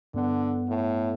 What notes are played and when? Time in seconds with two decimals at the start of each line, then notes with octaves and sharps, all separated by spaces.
0.14 G2 D3 B3 F#5
0.69 A2